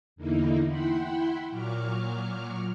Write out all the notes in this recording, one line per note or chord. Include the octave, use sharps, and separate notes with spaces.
E2 D3 A#3 D#4 E4
E4 F#5 G5 B5 C6
A#2 F#3 C#6 D6 F6